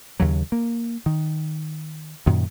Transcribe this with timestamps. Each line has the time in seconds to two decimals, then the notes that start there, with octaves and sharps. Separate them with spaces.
0.20 D#2 C#3 F#3
0.52 A#3
1.06 D#3
2.26 F#2 A#2 D#3